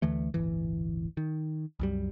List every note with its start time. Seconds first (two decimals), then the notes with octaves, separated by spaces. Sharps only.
0.02 D2 D3 E3 A3
0.34 D1 G1 E3
1.17 D#3
1.79 C2 F#2 G3